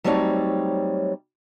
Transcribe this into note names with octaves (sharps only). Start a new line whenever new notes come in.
F#3 G3 A3 C4 D#4 C#5